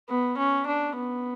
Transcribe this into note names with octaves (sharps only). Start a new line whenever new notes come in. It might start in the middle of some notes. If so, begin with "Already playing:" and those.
B3
C#4
D4
B3